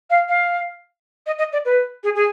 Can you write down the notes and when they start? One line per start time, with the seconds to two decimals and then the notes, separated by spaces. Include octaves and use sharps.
0.10 F5
0.29 F5
1.27 D#5
1.39 D#5
1.53 D5
1.65 B4
2.04 G#4
2.15 G#4